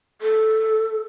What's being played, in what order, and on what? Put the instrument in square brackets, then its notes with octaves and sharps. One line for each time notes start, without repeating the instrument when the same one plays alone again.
[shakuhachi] A4